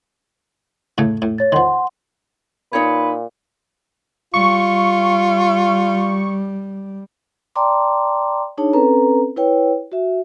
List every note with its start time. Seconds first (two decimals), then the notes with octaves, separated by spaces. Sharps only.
0.98 A2 C#3 A3
1.22 A2
1.38 C#5 A6
1.52 D#3 F3 F#5 C6
2.73 A#2 D#4 B4 C#5
4.34 G3 F4 C#6
7.55 D5 G5 A5 A#5 C6 D6
8.58 D4 D#4 G#4 C#5 A5
8.73 C4 C#4 A4 B4 A#5
9.36 E4 B4 C#5 G5
9.92 F#4 E5